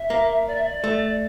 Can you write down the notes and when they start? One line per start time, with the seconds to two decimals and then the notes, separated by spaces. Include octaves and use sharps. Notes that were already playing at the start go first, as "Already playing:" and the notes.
Already playing: E5
0.10 A#3
0.47 D5
0.55 E5
0.64 D5
0.84 A3